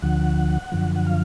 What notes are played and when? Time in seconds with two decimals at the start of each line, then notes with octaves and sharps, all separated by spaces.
0.02 D2 D3 F3 F#5
0.72 F#2 D3 F3
0.96 F#5
1.07 F5